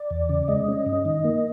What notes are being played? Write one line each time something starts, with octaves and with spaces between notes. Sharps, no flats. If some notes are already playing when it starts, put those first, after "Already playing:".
Already playing: D5
E2
C#3
G#3 D#5
C#4
G2
D#3
A#3